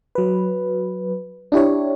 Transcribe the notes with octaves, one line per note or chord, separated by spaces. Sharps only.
F#3 B4
D4 E4 G4 C#5